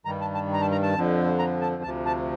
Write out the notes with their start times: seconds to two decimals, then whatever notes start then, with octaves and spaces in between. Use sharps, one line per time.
0.05 G2 D#3 G3 A#5
0.21 A5
0.35 A5
0.53 A#5
0.61 A5
0.72 A#5
0.83 A5
0.95 F2 D3 F3
1.39 A#5
1.61 A5
1.83 D2 C3 F3 A5
2.06 A5